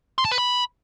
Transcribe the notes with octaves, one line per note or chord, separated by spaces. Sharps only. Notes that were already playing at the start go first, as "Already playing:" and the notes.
C6
A5
B4
B5